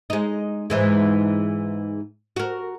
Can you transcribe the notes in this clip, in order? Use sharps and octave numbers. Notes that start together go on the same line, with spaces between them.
G#3 D#4
G#2 E3 G#3
F#4 A#4